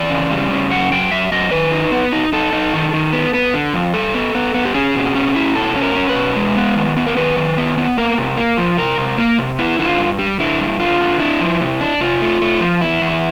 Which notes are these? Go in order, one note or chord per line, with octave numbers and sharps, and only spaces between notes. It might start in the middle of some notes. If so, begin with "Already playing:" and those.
Already playing: E3 D5
C#3
G3
C#3
F#2 F#5
F#2 G5
F#2 E5
F#2 D#5
D#3 B4
D#4
B3
D#4
D#4 A4
D#4
D#3
D#3
B3
B3
D3
F2
G3 A4
B3
B3
B3
G4
C#4 G#4
B2
C#4
E4
B2 A4
C#4
A#4
C#4
B4
B2
G#3
B3
D#3
B3
A#4
D#3 B4
D#3
B3
B3
A#3 A#4
C3
A#3
F3
C3 A#4
C3
A#3
C3
B3 E4
D3 E4
F4
G2
G3
D3 E4
G2
D3 F4
D3
D4 E4
F3
C3
D4
C3 F4
A3
A3
F3
E2 E4
E2